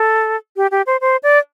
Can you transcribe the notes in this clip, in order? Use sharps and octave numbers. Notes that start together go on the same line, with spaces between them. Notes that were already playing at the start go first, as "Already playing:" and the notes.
Already playing: A4
G4
G4
C5
C5
D5